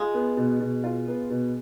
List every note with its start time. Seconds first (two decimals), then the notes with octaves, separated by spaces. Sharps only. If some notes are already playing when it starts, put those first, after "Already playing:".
Already playing: G#3 F4
0.14 B3
0.37 B2
0.60 B2
0.84 F4
1.07 B3
1.30 B2